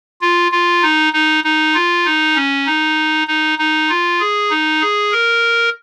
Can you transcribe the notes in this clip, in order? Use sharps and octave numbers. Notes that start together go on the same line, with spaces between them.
F4
F4
D#4
D#4
D#4
F4
D#4
C#4
D#4
D#4
D#4
F4
G#4
D#4
G#4
A#4